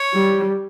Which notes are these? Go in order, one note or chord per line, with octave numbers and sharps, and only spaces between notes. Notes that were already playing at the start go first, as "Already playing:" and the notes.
Already playing: C#5
G3